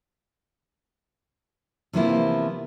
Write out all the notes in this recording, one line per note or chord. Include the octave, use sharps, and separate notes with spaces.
C3 E3 F3 A#3 B3 E4